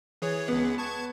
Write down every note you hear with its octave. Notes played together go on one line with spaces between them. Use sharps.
E3 G#4 C#5
C#2 B3 G#4
A5 C#6 G#6